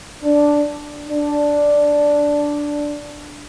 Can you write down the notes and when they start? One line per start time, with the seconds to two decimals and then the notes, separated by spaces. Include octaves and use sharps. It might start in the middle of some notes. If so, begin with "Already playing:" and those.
0.23 D4
1.07 D4